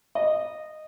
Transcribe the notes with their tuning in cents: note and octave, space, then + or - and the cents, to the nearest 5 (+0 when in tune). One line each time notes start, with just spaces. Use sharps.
D#5 -10